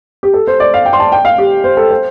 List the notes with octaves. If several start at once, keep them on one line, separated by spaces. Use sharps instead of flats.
G4
A4
C5
D5
F5
G5
C6
A5
G5
F5
G4
C5
A4
C5